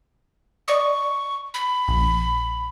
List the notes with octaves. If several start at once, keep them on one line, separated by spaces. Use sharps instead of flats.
D5 D#5 C#6
B5
A#1